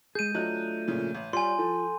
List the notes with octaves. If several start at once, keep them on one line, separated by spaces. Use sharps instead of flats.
G#3 G#4 G6 D#7
F#3 A3 D4 F4 D#5 F#6
A#2 C#3 F3
A1
G3 F4 C#5 D5 G#5 C6
F3 A4